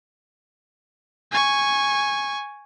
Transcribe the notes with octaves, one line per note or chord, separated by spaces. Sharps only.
G#5 C#6